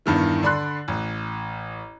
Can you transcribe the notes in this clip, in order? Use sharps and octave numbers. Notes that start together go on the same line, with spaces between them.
E2 G2 D#3 E3
D3 D5 B5 C6 F#6
A1